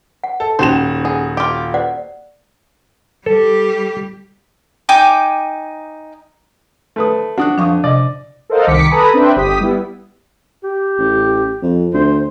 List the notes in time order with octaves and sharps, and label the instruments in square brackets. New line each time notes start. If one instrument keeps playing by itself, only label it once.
[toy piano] F#5
[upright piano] A4
[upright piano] D#1 F#4 E7 [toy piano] C#4 D#4 [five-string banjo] C5
[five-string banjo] G#4 [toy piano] F#5
[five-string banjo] F4 G4
[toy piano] C5 D5 F#5
[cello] G3 G4 [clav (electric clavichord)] A4
[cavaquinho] D#4 G5 G#5 D6
[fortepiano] A3 B4 D#6
[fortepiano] D4 F#4 [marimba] F#5 D#6 F#6
[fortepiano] F2 D#6 [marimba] D4 F5 C#6
[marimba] C3 [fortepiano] D5 D#5
[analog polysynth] A4 A#4 C5 D#5 F5 F#5
C2 D#3 D6 B6 C#7
A4 B4 G#5 A#5 B5 D#6
C4 D4 B4 C5 E5 G5
G1 G4 D#6 B6
G3 B3 E4
[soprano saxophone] G4
[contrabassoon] A1
F2
[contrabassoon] D2 [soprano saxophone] C5